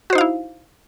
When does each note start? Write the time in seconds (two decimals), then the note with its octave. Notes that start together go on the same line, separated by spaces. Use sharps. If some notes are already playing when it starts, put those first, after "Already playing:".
0.10 F#4
0.13 C5
0.15 D#4
0.18 F5
0.21 E4